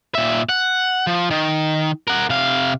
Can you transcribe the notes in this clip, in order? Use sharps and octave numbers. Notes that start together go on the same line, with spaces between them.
A#2 E5
F#5
F3
D#3
A#4 F#5
C3 F5